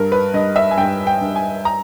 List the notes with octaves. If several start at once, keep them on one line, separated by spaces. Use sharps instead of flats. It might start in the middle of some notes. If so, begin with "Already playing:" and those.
Already playing: G2 A#4
B4
G2 D#5
E5
G#5
G2 G5
G5
G2
G#5
A#5